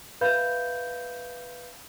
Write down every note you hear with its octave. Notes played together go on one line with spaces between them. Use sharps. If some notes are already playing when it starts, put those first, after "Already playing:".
B4 E5 F5 B5 G6